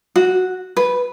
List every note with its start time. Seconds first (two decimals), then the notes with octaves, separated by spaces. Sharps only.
0.16 F#4
0.77 B4